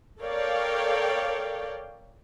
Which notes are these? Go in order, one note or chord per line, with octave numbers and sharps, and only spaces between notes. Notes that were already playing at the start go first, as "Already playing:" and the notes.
A4 A#4 C#5 D5 F5 G5